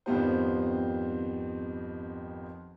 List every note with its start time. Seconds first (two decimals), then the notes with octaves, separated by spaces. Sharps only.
0.06 G#1 F2 F3 B3 G4 C5